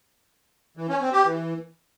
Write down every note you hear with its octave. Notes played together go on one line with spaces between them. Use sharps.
E3
C#4
C4
G4
E3